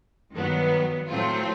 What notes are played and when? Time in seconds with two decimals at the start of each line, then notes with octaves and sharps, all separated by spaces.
0.34 G2 D#3 F#3 B3
1.09 A2 F#3 A3 C4 F4